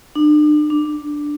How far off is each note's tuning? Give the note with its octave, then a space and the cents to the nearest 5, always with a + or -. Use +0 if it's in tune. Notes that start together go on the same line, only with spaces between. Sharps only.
D4 +40
D4 +0